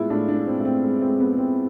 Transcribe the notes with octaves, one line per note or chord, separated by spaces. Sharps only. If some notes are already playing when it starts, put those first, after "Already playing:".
Already playing: A2 G#3 B3 E4 F4
A2 D4
D4
G#3
C4
A2
C4
G#3
C4
G#3
B3
G#3
C4